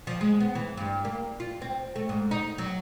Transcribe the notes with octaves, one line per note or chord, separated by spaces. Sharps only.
F3
G#3
B3
E3
G2
A#3
F4
C4
A3
G#2
D#4
F#3